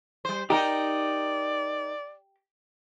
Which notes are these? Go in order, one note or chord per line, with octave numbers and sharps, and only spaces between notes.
G3 C5
D#4 G4 A#4 D5